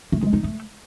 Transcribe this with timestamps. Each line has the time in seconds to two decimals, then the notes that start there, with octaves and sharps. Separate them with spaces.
0.12 A3
0.23 G#3
0.33 D#4
0.43 A3